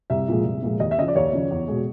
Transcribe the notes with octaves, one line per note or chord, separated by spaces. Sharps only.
C2 E5
A#2 F3 G#3
C2
A#2 F3 G#3
D#2 D#5
E5
C#3 F3 D#5
D5
D#2 C#5
C#3 F3
E2
B2 G#3